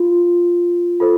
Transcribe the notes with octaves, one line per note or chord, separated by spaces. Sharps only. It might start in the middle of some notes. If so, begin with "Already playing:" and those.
Already playing: F4
F4 A4 C5